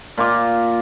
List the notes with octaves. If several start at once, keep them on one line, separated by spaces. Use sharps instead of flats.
A#2 F4 D6